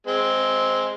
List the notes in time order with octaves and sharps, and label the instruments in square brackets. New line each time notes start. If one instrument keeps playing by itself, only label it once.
[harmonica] G#3 C4